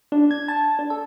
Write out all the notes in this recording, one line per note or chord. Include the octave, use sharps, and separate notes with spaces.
D4
G#6
A5
D4
A4